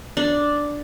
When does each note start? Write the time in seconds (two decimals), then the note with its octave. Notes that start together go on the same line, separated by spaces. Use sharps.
0.17 D4